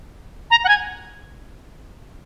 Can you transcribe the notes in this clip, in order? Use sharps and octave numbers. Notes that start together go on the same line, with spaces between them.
A#5
F#5
G#5